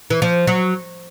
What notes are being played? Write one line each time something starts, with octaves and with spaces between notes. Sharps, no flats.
E3
F3
F#3